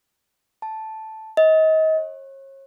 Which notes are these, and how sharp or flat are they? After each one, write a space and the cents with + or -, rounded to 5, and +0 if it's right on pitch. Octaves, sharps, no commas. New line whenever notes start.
A5 -5
D#5 +30
C#5 -35